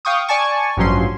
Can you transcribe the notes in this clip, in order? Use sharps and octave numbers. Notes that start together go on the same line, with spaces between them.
F5 G5 C#6 D#6
D5 G#5 A5 C#6
A1 G2 F3 F#3 C#4 C6